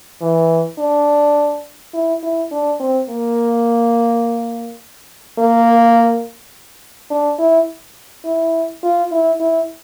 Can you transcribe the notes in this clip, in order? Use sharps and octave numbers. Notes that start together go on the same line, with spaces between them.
E3
D4
E4
E4
D4
C4
A#3
A#3
D4
E4
E4
F4
E4
E4